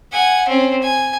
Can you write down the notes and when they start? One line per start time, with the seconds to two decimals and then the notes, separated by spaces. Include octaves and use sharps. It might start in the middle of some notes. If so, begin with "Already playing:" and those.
0.12 F#5 G#5
0.48 C4 C#4
0.82 G#5